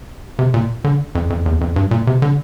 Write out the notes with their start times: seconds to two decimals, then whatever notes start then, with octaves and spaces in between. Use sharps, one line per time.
0.39 C3
0.54 A#2
0.84 D3
1.15 F2
1.30 F2
1.46 E2
1.61 F2
1.76 G2
1.91 A#2
2.07 C3
2.22 D3